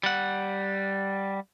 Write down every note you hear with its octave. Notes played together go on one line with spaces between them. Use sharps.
G3 F#5